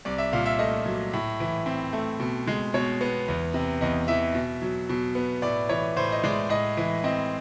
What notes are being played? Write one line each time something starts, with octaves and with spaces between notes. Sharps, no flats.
C2 D5
E5
A#2 F5
E5
A3 D#5
F#3
A2
E3
C4
A3
B2
G#3
B2 C#5
B3
E2
C3
E2 D#5
E3 E5
B2
F#3
B2
B3
A2 D5
E3 C#5
A2 C5
D#5
G#3 D5
A2 D#5
E3
C4 D#5